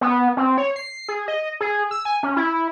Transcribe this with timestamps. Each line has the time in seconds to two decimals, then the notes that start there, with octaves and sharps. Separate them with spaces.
0.01 B3
0.37 C4
0.58 C#5
0.76 C7
1.09 G#4
1.28 D#5
1.61 G#4
1.91 E6
2.05 G#5
2.23 C#4
2.37 E4